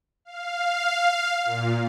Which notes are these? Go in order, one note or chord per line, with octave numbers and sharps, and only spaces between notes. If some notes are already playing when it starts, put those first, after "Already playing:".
F5
A#2